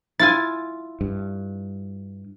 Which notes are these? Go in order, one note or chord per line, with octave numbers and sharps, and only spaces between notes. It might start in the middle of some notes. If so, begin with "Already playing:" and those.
E4 F4 G#5 A6
G2